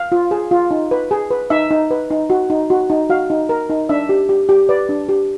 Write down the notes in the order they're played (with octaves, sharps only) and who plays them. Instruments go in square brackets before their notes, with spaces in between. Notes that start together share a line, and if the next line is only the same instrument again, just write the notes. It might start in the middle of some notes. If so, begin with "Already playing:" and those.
Already playing: [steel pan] F5
F4
G#4
F4
D#4
B4
G#4
B4
D#4 E5
D#4
B4
D#4
F#4
D#4
F#4
D#4
F#4 F5
D#4
A#4
D#4
D4 E5
G4
G4
G4
B4 D5
D4
G4